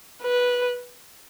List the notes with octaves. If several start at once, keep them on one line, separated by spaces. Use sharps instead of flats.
B4